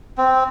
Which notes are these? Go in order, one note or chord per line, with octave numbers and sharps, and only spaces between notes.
C4